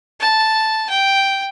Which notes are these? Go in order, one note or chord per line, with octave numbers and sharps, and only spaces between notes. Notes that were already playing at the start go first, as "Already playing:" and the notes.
A5
G5